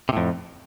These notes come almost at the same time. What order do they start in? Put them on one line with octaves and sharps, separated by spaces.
C3 A2 F2